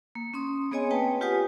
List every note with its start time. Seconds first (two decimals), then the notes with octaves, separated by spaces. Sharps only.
0.15 A#3
0.34 C#4 C6 D#6
0.71 B3 C4 G#4 C#5 D#5 G#5
0.91 A#3 B4 G5 A5
1.21 F4 G4 B4 F#5 G#5 D#6